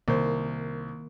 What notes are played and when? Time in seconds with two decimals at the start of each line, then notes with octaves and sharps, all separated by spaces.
0.08 C2 D#3 A#3 A#4 C5